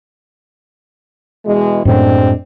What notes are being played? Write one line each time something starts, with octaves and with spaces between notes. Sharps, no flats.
B2 E3 G#3
F#2 A2 F#3 G#3 C4 D4